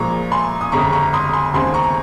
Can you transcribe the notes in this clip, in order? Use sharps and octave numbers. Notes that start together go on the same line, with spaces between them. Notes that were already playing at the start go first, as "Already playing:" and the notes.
Already playing: A#2 F3 G#3 A#5 C#6
G#5 C6
D#6
G1 F2 C#3 G#3 A#5 C#6
A#5 C#6
C6 D#6
G#5 C6
D#2 C#3 G#3 C4 G#5 C6
A#5 C#6